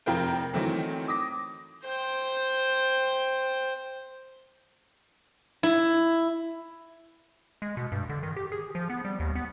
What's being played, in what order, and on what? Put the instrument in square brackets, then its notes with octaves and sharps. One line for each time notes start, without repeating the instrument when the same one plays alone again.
[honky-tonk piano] F1 F3 C4 A#4 G5
D#3 E3 F#3 A3 C4
D6 D#6 A#6
[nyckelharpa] C5 G5
[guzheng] E4
[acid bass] G#3
B2
G2
D3
D#3
G4
G#4
F3
B3
G3
D#2
B3